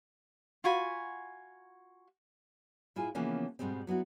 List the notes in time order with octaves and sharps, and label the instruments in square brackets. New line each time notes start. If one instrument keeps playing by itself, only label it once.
[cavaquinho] F4 F#4 G#5 B5
[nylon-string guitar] A2 E4 F4 G#4 G#5
C#3 E3 F3 A#3 B3 C#4
G#2 B2 G3 G#3 C4
F#3 B3 E4 F#4